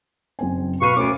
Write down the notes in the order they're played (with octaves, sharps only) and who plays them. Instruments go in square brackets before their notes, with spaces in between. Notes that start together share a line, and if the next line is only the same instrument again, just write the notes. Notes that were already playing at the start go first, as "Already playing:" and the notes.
[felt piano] F#1 C4 G#5
[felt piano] B2 D#7 [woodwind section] B4 F5 C#6
[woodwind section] D2 D6 [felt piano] C#4 A#4